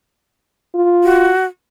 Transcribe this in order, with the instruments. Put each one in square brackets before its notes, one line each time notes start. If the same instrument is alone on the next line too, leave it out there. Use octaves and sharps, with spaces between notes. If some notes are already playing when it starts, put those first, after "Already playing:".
[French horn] F4
[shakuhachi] F#4